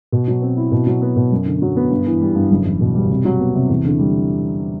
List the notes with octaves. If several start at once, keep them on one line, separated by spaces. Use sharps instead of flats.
B2
F#3
C4
E4
B2
F#3
B3
B2
F#2
D3
F#3
B3
G2
E3
G3
G2
F#1
E2
B2
G3
C3
F#3
B3
C3
E2
D3
G3